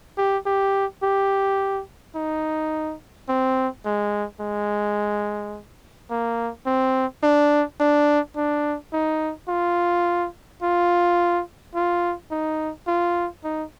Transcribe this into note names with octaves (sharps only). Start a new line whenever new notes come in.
G4
G4
G4
D#4
C4
G#3
G#3
A#3
C4
D4
D4
D4
D#4
F4
F4
F4
D#4
F4
D#4